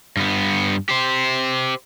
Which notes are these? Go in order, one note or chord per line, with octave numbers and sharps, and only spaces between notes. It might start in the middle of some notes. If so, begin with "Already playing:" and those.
G2 B3
G4 C5